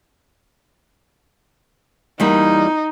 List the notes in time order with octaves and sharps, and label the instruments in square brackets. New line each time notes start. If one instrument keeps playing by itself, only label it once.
[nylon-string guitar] E2 G3 A#3 [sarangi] D#4